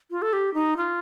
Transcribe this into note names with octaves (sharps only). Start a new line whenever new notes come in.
F4
A4
G4
D#4
F4